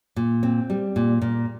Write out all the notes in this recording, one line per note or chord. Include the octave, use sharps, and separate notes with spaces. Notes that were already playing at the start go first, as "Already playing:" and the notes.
A#2
C4
G3
A#2
A#2